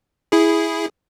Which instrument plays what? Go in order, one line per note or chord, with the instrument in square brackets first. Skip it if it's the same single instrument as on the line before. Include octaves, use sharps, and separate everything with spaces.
[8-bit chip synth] E4 G#4